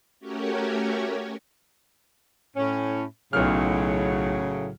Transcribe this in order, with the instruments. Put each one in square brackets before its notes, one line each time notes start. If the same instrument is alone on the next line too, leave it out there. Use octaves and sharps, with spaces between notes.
[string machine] A3 C#4 F#4 G4 A#4 C#5
[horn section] A2 C#4
[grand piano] B1 F6 [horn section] A2 C#3 F#3